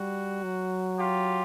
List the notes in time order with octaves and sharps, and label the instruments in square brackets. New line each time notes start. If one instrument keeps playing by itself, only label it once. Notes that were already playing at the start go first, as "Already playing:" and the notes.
Already playing: [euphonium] G3 [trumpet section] F#4
[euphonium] F#3
[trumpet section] F4 G4